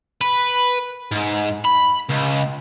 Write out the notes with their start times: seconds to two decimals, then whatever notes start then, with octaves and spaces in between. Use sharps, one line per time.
0.21 B4
1.11 G#2
1.65 B5
2.09 C#2